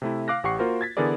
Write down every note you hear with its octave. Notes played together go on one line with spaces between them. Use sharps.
C3 A3 E4
F5 D6 F#6 A#6
A1 G4 F#5 C#6 C7
A#3 F4 F#4 A#4 C5
G#6 A6 B6
D3 E3 B3 G#4 A#4 D5